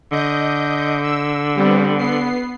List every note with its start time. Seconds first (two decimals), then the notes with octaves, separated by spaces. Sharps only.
0.12 D3 D#5 G6
1.03 E6
1.55 G3 B3 C4
1.98 B3 C7